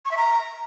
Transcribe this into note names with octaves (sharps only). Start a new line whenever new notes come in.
C#6
E5
A#5